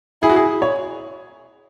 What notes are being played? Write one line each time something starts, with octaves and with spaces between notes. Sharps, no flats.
E4 G#4
F#4
G#4
C#5